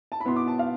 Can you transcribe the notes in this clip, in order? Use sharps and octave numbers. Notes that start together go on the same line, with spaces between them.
A5
B5
B2 B3 E4 C6
D6
A5
F5